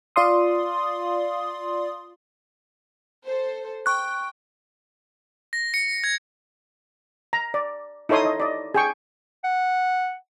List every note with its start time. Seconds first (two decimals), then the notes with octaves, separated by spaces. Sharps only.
0.16 F4 D5 F5 C6 D#6
3.25 A4 C5
3.86 G5 C#6 F#6
5.53 A#6
5.74 C#7
6.04 G#6
7.33 A#5
7.54 D5
8.09 D#4 E4 A4 C#5 C6 D#6
8.25 D#5
8.40 D5 D#5
8.74 G#4 G5 C#6
9.44 F#5